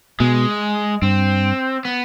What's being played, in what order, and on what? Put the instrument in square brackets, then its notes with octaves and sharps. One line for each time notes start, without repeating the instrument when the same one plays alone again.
[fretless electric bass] B2 [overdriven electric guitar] G#3
[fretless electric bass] G2 [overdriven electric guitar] C4
[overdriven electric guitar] B3